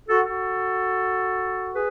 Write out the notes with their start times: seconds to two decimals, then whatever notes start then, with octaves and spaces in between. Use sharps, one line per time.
0.08 F#4 A4
0.25 F#4 A4
1.74 G#4 B4